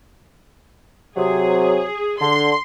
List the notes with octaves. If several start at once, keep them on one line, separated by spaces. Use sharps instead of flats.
C3 F#3 G#4
D3 C6